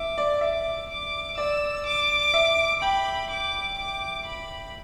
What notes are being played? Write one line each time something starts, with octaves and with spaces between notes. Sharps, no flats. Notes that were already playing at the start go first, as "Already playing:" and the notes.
Already playing: E5 D6
D5
E5 D6
D6
D5 E6
D6
E5
G5 B5
D6
D6
B5